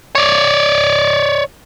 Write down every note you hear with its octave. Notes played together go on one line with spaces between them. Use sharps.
C#5 D5